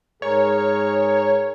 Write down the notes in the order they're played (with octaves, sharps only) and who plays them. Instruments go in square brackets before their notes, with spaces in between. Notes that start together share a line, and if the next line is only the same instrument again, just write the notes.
[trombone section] G#2 G#4 A#4 [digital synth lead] C#5